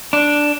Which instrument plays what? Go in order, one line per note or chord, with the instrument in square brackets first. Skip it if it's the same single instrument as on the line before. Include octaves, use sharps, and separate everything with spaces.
[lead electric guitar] D4